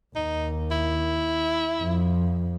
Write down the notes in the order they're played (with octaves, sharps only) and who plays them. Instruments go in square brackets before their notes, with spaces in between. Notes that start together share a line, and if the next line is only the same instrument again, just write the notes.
[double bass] D#2 [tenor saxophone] D#4
[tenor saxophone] E4
[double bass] F2 F3